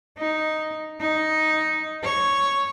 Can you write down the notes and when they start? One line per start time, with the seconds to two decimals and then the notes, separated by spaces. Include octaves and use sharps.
0.18 D#4
1.00 D#4
2.03 C#5